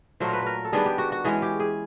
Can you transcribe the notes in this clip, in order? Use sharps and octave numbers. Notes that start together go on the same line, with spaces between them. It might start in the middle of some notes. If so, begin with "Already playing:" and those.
A#2 F#3 A3 C5
A#4 B4
A#4 B4
A4
D#3 G3 B3 D4 G#4
G4
F#4
F#4
E3 G#3 C#4 G#4
G4
G#4